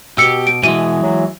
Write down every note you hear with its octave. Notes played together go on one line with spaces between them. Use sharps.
B2 G4 E6 C#7
D7
B2 E3 G#3 D#7
F#3